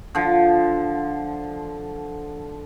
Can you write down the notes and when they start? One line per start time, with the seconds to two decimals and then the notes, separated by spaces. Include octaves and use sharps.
0.15 D3 F3